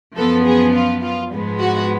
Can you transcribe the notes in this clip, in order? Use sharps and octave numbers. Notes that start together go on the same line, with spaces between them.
F#2 F3 B3 A4
G#4
F4
F4
G#2 F3 G#3 B3
F#4